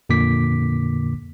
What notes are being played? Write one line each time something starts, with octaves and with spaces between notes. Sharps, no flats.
F2 A#2 D3 A#3 D6 B6